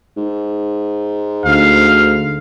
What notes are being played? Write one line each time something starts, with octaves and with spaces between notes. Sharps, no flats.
G#2
D2 F5